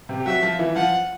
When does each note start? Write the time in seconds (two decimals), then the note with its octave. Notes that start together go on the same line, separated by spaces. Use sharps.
0.09 C3 C4
0.20 G4
0.26 F#3 F#4 E5
0.42 F3 F4
0.59 E3 E4
0.75 F3 F4 F#5